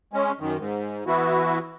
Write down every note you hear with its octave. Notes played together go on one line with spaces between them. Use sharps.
G#3 C#4
F#2 D#3
G#2
E3 B3 E4 F#4